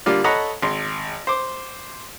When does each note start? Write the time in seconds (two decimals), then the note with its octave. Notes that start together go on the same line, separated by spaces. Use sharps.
0.06 D3 G3 A#3 F4 D5
0.24 A4 C#5 D#5 F#5 A#5 B5
0.62 G#1 C6
1.27 C5 D6